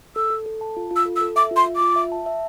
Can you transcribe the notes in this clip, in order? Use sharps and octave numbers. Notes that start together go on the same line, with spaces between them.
A4 E6
A4
A4
A5
F4
F4
E6
A4
E6
A4
E5 D6
F4
C6
F4
F4 D6
E5
A5
E5